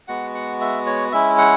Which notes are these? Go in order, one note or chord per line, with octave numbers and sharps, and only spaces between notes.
G#3 B3 F#4 F#5
F#5
E5
C#5
G#3 C#4 E4 E5
F#5